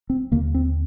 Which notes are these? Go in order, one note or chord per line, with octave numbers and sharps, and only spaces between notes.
C4
D#2 D3 A#3
C4